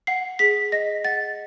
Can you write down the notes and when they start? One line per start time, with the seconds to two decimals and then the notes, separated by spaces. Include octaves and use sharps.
0.07 F#5 C7
0.39 G#4 B6
0.72 D#5 A#6
1.04 F#5 A6